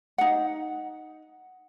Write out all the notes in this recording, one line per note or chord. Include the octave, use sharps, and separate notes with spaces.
D#4 F#5